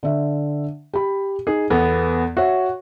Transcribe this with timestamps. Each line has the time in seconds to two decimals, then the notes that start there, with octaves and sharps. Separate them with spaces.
0.03 D3 E5
0.93 G4 B5
1.47 D#4 G#4
1.70 E2 B3 A4
2.37 F#4 C#5 E5